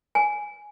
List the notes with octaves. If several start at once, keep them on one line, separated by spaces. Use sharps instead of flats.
G#5